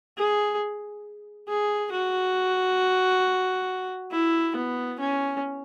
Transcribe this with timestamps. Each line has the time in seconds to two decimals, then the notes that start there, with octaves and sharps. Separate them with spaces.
0.17 G#4
1.48 G#4
1.92 F#4
4.11 E4
4.55 B3
4.99 C#4